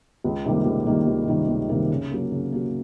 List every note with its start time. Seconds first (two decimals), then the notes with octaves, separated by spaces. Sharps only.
0.24 C#2
0.45 C3 D#3 G3 A#3
0.66 C#2
0.86 C3 D#3 G3 A#3
1.06 C#2
1.28 C3 D#3 G3 A#3
1.48 C#2
1.69 C3 D#3 G3 A#3
1.90 C#3
2.11 F#3 A#3
2.32 C#3
2.52 F#3 A#3